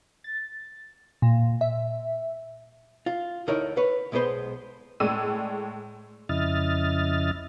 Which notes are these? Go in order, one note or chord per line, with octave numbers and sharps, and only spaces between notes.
A6
A#2
E5
F4
D2 D3 D#4 E4 A#4 C#5
B4 C#5
B1 G#3 B3 B4 C5 C6
A2 G#3 D5 E6 D#7
F2 C#3 E4 D#5 F6 A6